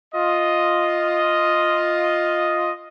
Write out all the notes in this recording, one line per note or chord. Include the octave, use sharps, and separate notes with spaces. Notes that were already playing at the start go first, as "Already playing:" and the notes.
F4 D#5